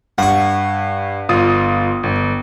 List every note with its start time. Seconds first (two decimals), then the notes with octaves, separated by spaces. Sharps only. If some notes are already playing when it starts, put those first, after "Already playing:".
0.18 G2 F#5 C#6
1.29 G1 F4 D#6
2.03 G1